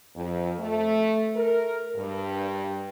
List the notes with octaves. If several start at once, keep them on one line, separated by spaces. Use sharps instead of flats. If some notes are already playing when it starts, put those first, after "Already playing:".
F2
A3
A#4
G2